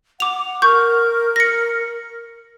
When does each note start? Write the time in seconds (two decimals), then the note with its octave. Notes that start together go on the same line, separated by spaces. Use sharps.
0.20 F#5 D6 F7
0.62 A#4 C#6 G6
1.36 A#6 C#7